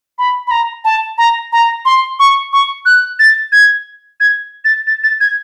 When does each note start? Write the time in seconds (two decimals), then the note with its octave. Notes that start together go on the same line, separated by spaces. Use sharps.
0.18 B5
0.47 B5
0.51 A#5
0.85 A5
1.18 A#5
1.53 A#5
1.85 C6
2.19 C#6
2.53 C#6
2.86 F#6
3.19 A6
3.52 G#6
4.20 G#6
4.65 A6
4.87 A6
5.04 A6
5.21 G#6